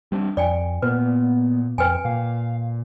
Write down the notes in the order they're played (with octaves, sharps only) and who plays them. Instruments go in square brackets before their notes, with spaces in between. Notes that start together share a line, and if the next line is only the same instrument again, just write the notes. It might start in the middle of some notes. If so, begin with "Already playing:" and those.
[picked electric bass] G3 C4 D4
[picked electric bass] F2 [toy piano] D5 G5 G#5
[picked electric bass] A#2 [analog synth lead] B3 [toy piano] B4
[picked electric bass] F2 [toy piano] B4 G5 G#5
[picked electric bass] A#2 [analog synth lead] F5